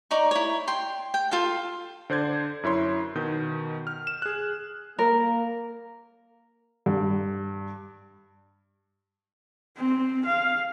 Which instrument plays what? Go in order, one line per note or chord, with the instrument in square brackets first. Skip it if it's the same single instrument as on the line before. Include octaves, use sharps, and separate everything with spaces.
[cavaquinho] D#4 D5 A#5 C#6
E4 C#5
G5 C6
G5
F4 A4 F5
[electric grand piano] D3 C5 D5 G6 G#6
F#2 E4 C#5 C6
B2 D#3 G6
F6
E7
G#4 F#6
[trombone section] A#3 [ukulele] A#4
[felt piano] G2
[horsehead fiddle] C4
F5